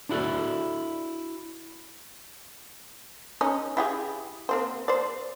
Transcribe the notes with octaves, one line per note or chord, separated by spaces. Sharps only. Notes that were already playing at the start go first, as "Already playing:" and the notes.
D4 E4 F#4 A4 D5
C#4 D#4
E4 G4 G#4
A#3 C4 C5
C5 D5